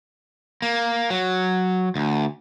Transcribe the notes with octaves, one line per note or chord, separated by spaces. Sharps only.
A#3
F#3
D2